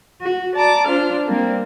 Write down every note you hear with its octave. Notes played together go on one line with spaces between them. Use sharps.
F#4
D5 A5 A#5 D6
D4 F4 C5 F6
G3 A#3 C4